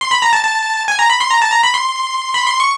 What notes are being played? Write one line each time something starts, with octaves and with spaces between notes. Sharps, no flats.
C6
B5
A#5
A5
A5
G#5
A#5
B5
C6
A#5
A5
A#5
B5
C6
B5
C6
C#6